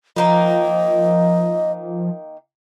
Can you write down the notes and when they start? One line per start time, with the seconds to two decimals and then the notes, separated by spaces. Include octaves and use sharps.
0.16 D#3 F3 A#3 D#4 D#5